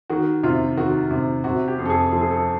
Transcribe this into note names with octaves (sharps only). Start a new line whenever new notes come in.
D#3 F#4
C3 F4
D#3 F#4
C3
C3 F#4
G4
F2
A4
G#4
F3 A4
G#4
A4